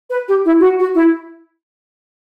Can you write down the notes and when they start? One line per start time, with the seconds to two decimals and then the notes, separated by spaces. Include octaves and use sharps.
0.10 B4
0.27 G4
0.44 E4
0.61 F#4
0.78 F#4
0.95 E4